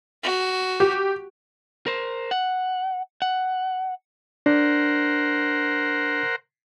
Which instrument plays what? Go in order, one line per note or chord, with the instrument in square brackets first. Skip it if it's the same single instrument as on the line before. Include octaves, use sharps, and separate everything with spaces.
[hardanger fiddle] F#4
[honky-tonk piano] G4
[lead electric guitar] A#4 C5
F#5
F#5
[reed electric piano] D4 [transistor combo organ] A#4 C5 F#5